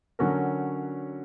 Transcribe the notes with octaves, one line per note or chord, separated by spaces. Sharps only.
D3 F#3 C#4 F#4 A#4